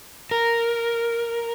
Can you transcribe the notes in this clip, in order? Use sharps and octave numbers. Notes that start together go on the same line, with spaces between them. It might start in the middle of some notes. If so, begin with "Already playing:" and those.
A#4